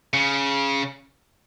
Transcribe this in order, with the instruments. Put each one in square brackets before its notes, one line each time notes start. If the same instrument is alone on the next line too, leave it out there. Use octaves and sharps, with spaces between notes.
[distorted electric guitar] C#3